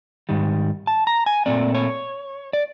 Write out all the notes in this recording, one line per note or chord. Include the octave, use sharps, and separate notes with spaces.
G#2 D#3 G3
A5
A#5
G#5
A#2 F3 A3 C4 D5
C#5
D5